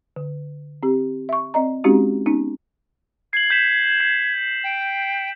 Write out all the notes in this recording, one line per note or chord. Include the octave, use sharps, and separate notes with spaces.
D3
C4 G4
E5 C#6
C4 D5 D#5 A#5
G#3 C4 C#4 D#4 F#4 G4
B3 C#4 D#4
G#6 C7 F#7
G6 B6 E7
C7
G5